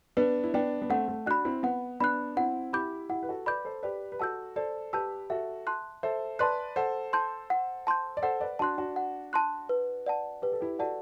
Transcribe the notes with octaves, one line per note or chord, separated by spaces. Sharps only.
B3 D4 B4
E4
B3 D4 D5 G5
B3
A3 C4 F#5
A3
D4 F#4 B5 F#6
C4 E4
B3 F#5
B3 D4 B5 F#6
C4 E4 F#5
E4 G4 B5 D6 G6
E4 G4 F#5
B4
F#4 A4
B4 D5 B5 D6 G6
A4 C5
G4 B4 D5
B4
F#4 A4 A5 E6 G6
A4 C5 D5
G4 B4 A5 E6 G6
F#4 A4 E5
A5 C6 F#6
A4 C5 E5
B4 D5 A5 C6 F#6
A4 C5 F#5
A5 C6 G6
F#5
A5 C6 G6
D5
A4 C5 F#5
B4 D5
D4 F#4 A5 C6 F#6
D4 F#4
F#5
A5 C6 F#6
B4
D5 F#5 A5
G4 B4
A4
E4 G4
F#4 A4 D5 F#5 A5